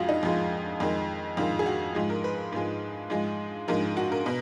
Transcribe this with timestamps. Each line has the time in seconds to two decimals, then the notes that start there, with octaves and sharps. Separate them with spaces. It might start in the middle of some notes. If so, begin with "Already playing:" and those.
Already playing: F2 F3 G#3 F4 F#4
0.09 D#4
0.23 F2 F3 G#3
0.80 F2 D#3 G#3
1.37 F2 D#3 G#3 F4
1.59 G#4
1.66 F#4
1.95 G#2 F3 G#3
2.10 A#4
2.24 B4
2.52 G#2 F3 G#3
3.10 G#2 F3 G#3
3.68 G#2 F3 G#3 A#4
3.97 F#4
4.12 A#4
4.26 B2